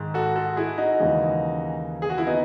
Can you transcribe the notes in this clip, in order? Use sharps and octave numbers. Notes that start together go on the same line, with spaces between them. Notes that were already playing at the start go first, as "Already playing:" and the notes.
Already playing: G#2 D#3 G#3
F#4 A4
F#4 A4
E4 G#4
D#4 F#4
D#2 C#3 E3 G#3
G#4
F#4
E4
B3 D#4